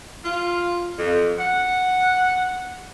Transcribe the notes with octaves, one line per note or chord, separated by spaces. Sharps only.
F4
F2
F#5